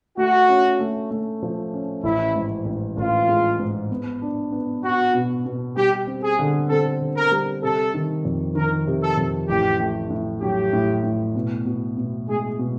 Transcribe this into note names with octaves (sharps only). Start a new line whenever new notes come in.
A3 F#4
C#4
A3
A3
F3
C#4
A1 E4
G#2
A1
A1 F4
G#3
G#2
B3
D4
B3
B3 F#4
B2
B2
G3 G4
C4
G#4
D3
C4 A4
D3
A#4
G3
C3 A4
D#3
F2
D#3 A#4
C3
A4
F2
A1 G4
A3
A2
F#3 G4
A2
A2
B2
B2
B2
G#3 G#4
B2